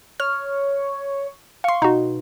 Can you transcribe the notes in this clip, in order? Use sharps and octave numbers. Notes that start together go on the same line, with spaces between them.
C#5 F6
F5 C6 C#6
B2 D#4 F#4